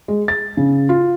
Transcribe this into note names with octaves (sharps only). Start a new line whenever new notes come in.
G#3
A6
C#3
F4